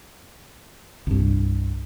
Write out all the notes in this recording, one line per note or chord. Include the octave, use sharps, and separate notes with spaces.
C2 G2